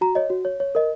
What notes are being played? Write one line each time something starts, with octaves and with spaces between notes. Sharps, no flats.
F#4 A#5
C#5 D#5
F#4
C#5
C#5
A#4 D#5